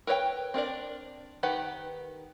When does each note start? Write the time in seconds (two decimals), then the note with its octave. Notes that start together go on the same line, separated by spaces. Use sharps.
0.07 A#4 B4 C#5 E5 G5
0.54 C4 D4 A#4 D5
1.43 D#3 G4 B4 F#5